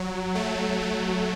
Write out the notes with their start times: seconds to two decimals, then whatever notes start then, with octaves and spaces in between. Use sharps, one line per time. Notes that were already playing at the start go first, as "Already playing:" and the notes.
Already playing: F#3
0.35 A3
0.82 A3